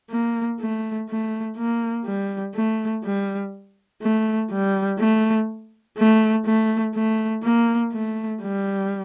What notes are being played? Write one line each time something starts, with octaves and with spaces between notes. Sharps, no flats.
A#3
A3
A3
A#3
G3
A3
G3
A3
G3
A3
A3
A3
A3
A#3
A3
G3